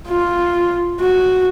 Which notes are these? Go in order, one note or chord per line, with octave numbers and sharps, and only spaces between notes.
F4
F#4